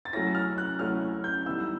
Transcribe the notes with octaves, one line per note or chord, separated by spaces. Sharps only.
A6
F#3 A3 C#4 E4 A#6
F6
F#6
F#3 A3 C#4 E4 F6
G6
D#3 G3 B3 E4 E6